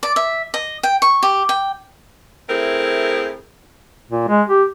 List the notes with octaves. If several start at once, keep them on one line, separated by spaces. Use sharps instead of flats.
D5
E5
D#5
G5
C#6
G4
G5
A3 C4 E4 G#4 A#4
A#2
G#3
G4